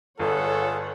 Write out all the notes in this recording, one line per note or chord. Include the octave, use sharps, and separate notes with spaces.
G1 F4 G#4 A4 C#5 F#5